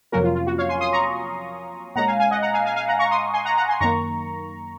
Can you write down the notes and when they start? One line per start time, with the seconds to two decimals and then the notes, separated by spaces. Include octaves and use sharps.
0.12 F2 C3 F#3 A#3 C#4 F#4 A#4
0.24 F4
0.35 F4
0.46 F#4
0.58 C#5 F5
0.69 G#5 C6
0.81 C6 D#6
0.93 A#5 C#6
1.96 A#2 G#3 C#4 F#5 A#5
2.07 F5 G#5
2.19 F5 G#5
2.31 D#5 F#5
2.42 F#5 A#5
2.53 F5 G#5
2.66 F5 G#5
2.76 F5 G#5
2.88 F#5 A#5
2.99 A#5 C#6
3.11 C6 D#6
3.34 G#5 C6
3.45 F#5 A#5
3.57 F#5 A#5
3.68 G#5 C6
3.80 F#2 D#3 A#3 A#5 C#6